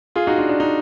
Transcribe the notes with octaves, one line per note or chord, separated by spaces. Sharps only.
F4 G#4
D#4 F#4
D4 F4
D4
D#4